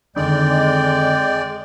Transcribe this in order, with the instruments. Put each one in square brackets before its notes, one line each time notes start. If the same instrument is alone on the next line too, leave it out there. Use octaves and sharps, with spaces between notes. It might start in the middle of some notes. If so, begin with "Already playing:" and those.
[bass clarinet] F2 [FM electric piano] D3 D#3 [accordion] G#3 D5 [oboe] G5